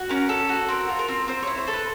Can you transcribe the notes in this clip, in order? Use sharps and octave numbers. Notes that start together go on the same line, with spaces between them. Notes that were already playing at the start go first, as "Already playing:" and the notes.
Already playing: F#4
C#4 A#4
A4
F#4
C4 A#4
F4
A#4
C4
C4 C5
E4 C#5
C5
A4
B4